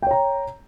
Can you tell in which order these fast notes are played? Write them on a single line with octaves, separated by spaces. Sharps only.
G5 C#5 A#5